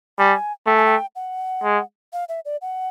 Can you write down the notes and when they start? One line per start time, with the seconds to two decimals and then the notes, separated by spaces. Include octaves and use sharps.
0.18 G3 G#5
0.66 A3 G5
0.76 G#5
0.85 G5
1.16 F#5
1.64 G#3
2.13 F5
2.29 E5
2.45 D5
2.62 F#5